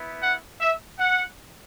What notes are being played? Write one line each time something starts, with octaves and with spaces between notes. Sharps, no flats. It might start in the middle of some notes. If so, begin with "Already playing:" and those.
Already playing: B3 E4
F#5
E5
F#5